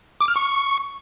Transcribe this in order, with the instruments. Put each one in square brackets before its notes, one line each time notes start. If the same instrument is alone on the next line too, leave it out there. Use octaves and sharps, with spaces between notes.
[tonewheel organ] D6
F6
C#6